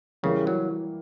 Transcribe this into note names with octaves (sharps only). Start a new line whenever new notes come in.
C#3 E3 G3 A#3
F#3